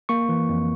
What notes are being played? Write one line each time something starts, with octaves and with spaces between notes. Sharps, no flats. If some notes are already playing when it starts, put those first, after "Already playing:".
A#3 C#6
E3
F2